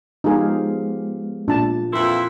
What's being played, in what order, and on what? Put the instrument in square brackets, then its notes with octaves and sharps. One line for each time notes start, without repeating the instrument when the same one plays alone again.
[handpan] F3 G4 F5 [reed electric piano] G#3 B3 [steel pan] D#4 G#4
[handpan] A#2 [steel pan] D4 A5
[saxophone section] F2 E3 E4 [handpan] F4 A#4 [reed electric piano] C6